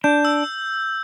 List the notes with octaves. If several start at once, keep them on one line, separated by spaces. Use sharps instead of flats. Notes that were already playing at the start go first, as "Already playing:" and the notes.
D4 G6
E6